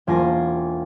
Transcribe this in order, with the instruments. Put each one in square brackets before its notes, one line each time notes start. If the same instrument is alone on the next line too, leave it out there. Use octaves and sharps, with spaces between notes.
[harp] E1 A#3 F4 G#5 A#6 C7